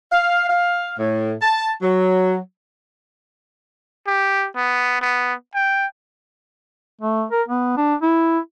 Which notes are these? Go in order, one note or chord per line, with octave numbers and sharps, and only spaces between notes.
F5
F5
A2
A5
F#3
G4
B3
B3
G5
A3
A#4
B3
D4
E4